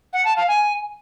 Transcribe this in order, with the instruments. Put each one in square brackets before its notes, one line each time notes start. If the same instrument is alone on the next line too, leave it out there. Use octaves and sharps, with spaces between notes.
[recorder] F#5
A5
F5
G#5